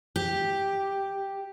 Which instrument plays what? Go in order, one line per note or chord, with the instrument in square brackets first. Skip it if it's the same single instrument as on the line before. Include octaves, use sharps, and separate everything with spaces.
[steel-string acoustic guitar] G4